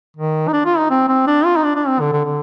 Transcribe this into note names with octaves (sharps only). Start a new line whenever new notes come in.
D#3
D#4
D4
F4
D#4
C4
C4
D4
F4
D#4
D4
D4
C4
D3
D3
D3